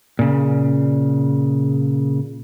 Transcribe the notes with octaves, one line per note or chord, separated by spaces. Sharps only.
A#2 C#3